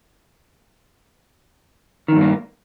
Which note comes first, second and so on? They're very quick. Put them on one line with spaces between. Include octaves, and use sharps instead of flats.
D#3 E2 G2 A#3